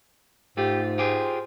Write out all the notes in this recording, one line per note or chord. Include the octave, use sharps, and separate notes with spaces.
G#2 A3 F4 G4
F4 G4 G#4 C5